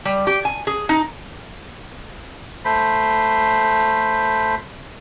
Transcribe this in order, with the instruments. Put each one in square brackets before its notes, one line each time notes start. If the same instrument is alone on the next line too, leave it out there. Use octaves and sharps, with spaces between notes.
[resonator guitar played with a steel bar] G3
G4
G#5
G#4
D#4
[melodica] A3 C5 B5